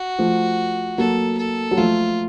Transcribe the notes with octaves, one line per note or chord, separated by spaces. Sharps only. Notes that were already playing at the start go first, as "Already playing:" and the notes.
Already playing: F#4
F3 A3
F#3 A#3 A4
A4
F#3
F3 A3 F4